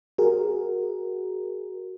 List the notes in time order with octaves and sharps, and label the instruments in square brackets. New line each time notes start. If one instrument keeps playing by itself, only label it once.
[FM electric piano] F#4 G#4 A#4